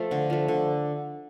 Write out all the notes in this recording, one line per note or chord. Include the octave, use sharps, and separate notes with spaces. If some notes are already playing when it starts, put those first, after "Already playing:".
Already playing: F3 A3
D3
F3 A3
D3